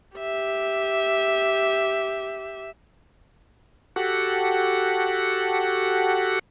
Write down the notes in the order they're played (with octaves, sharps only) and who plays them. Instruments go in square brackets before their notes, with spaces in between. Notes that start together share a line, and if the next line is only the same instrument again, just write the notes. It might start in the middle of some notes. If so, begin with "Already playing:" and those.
[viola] G4 E5
[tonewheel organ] F#4 G4 A4 F#5